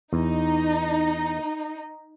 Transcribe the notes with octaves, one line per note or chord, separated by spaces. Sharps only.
E2 D#4